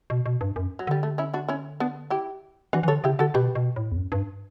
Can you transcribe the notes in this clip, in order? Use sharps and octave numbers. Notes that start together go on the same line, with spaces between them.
B2
B2
G2
F#2
F#3
D3 G3
A3
C#4 E4
D4 F#4
C#4 E4
B3 D4
E4 G4
E3 D4 F#4
E3
D3 A4 C#5
C#3 E4 G4
D3 F#4 A4
B2 G4 B4
B2
A2
E2
F#2
G2